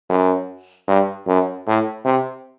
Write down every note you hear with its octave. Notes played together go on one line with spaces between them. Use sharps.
F#2
G2
F#2
A2
C3